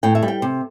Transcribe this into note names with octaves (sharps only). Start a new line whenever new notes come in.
A2 G5
E5
G3
G5
C3